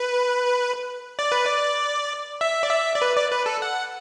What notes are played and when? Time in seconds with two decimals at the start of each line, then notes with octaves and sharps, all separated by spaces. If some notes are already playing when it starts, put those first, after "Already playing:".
Already playing: B4
1.19 D5
1.32 B4
1.45 D5
2.41 E5
2.63 D5
2.70 E5
2.95 D5
3.02 B4
3.16 D5
3.32 B4
3.46 A4
3.62 F#5